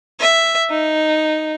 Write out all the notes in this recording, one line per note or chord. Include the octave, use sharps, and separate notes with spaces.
E5
D#4